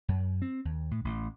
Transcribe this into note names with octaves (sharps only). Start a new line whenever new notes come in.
F#2
C4
D#2
A2
A1